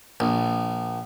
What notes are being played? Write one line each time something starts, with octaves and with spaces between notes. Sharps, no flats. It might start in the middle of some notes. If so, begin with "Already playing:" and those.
A#1